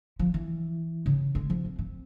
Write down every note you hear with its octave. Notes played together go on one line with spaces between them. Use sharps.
F3
E3
C#3
G#3
F3
C4
C4